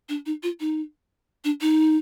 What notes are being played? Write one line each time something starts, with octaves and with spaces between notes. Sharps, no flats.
D4
D#4
F4
D#4
D4
D#4